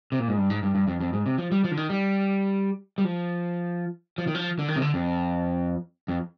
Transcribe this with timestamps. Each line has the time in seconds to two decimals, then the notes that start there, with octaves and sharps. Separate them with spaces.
0.12 C3
0.19 A#2
0.28 G#2
0.38 G2
0.50 G#2
0.63 G2
0.75 G2
0.87 F2
1.00 F2
1.13 G#2
1.26 C3
1.38 F3
1.52 G3
1.64 F3
1.71 D3
1.77 D#3
1.89 G3
2.98 G3
3.04 F3
4.18 F3
4.27 D#3
4.35 F3
4.59 D3
4.68 D#3
4.76 C3
4.82 D3
4.94 F2
6.08 F2